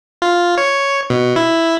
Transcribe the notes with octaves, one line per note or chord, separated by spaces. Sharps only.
F4
C#5
B2
E4